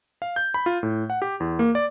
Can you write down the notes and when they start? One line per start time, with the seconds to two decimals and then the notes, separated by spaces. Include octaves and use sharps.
0.22 F5
0.36 G6
0.54 B5
0.66 F4
0.83 A2
1.10 F#5
1.22 G4
1.40 E2
1.59 A#3
1.75 D5